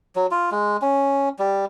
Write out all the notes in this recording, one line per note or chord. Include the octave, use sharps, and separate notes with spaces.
F#3
F4
G#3
C#4
G3